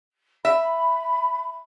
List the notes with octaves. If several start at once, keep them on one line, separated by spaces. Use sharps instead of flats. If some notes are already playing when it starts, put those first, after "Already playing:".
E5 B5